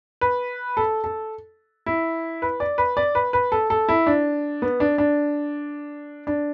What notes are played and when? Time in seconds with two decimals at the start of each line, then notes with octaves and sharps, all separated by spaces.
0.21 B4
0.77 A4
1.04 A4
1.86 E4
2.42 B4
2.60 D5
2.78 B4
2.97 D5
3.15 B4
3.33 B4
3.52 A4
3.70 A4
3.89 E4
4.07 D4
4.62 B3
4.80 D4
4.98 D4
6.27 D4